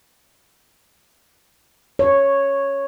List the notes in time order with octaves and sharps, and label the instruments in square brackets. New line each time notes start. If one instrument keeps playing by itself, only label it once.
[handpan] C#5